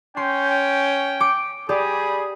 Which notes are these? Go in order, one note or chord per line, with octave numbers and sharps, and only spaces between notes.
C#4 G5 C6
D6 C#7
G3 G4 G#4 D5 B5 D#6